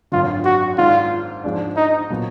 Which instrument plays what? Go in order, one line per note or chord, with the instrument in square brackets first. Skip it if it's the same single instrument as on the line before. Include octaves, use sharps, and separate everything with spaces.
[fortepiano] G#1 F#2 D3 [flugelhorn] F4
[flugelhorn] F#4
[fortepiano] G#2 D#3 G#3 D4 [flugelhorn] F4
[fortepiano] G#2 F3 G#3 D4
[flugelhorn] D#4
[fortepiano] A#2 F#3 B3